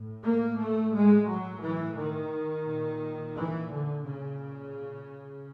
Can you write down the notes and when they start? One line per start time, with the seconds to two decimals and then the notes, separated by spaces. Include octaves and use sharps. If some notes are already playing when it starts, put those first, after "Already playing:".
Already playing: A2
0.23 A#3
0.57 A3
0.92 G#3
1.27 F#3
1.61 E3
1.96 D#3
2.66 A#2
3.35 E3
3.69 D3
4.04 C#3